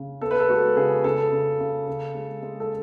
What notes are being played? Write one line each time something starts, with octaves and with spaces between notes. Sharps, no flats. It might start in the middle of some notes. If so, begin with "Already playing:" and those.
Already playing: C#3
B3 A4
B4
A4
G#3 F#4
C#3 G#4
C#3 A4
C#3
C#3
C#3
G#3
G#3
A4